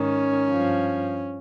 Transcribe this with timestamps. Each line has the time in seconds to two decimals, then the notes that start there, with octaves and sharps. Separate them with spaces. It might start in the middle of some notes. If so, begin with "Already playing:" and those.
Already playing: G#2 D#3 C#4
0.50 G2 F3